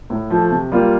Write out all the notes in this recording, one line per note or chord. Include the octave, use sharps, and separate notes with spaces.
A2
F3 A3
C3
G3 A#3 F4